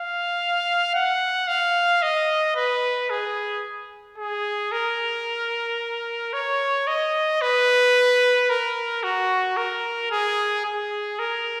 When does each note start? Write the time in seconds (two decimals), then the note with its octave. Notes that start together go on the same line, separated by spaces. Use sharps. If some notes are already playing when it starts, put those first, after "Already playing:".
Already playing: F5
0.94 F#5
1.47 F5
2.02 D#5
2.56 B4
3.10 G#4
4.18 G#4
4.72 A#4
6.33 C#5
6.87 D#5
7.41 B4
8.49 A#4
9.03 F#4
9.57 A#4
10.11 G#4
10.65 G#4
11.19 A#4